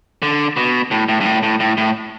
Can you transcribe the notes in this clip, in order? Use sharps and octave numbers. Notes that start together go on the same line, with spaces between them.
D3
B2
A2
A2
G2
A2
A2
A2
A2